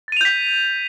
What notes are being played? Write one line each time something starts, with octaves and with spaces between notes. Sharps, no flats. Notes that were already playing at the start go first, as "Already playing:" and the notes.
G6 A6 B6 D#7 F7